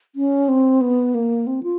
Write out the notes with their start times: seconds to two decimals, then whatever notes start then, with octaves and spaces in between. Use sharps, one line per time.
0.16 C#4
0.49 C4
0.81 B3
1.14 A#3
1.47 C4
1.63 F4